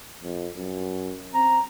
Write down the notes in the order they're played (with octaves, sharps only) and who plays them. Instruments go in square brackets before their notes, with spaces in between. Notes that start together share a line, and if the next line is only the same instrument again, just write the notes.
[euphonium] F2
F#2
[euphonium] C4 [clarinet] A#5